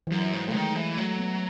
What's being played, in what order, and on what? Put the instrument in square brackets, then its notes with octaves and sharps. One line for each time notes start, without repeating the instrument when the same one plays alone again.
[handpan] E3
[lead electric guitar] F#2 [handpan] F#3
[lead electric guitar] G#2
[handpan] A3
[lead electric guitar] D#3 [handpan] G#3
[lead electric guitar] E3
[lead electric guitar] F#3 [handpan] A3
[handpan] B3